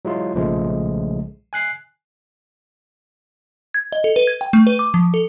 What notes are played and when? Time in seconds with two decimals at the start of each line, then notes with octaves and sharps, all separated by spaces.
0.05 F#3 G#3 E4 F4
0.34 B1 A#2 C#3 F3 G#3 A3
1.53 G#5 F#6 C7
3.74 G#6
3.92 D#5
4.04 A4
4.16 B4
4.27 G#6
4.41 G5
4.53 A3
4.67 B4
4.79 D6
4.94 F3
5.14 A4